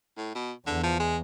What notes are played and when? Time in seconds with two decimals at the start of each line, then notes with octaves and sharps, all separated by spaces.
0.18 A2
0.35 B2
0.67 E2 D3
0.83 F3
1.00 G#3